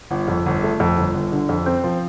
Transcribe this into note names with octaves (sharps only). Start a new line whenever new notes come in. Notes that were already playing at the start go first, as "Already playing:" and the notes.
G1
F2
G1
A3
F2
G1
G1
D3
F2
C4
F3